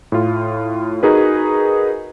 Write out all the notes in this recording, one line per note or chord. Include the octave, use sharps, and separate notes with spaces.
A2 F4
D#4 F#4 G#4 A#4 B4